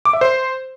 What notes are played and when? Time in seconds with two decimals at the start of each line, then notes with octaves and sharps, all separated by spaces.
0.05 D6
0.13 E5
0.21 C5